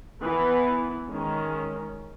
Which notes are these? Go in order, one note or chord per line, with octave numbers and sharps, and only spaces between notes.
E3 B3 B4
D#3 G#3 C#4